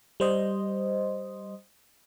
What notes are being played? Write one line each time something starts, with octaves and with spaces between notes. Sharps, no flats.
G3 C5 D#5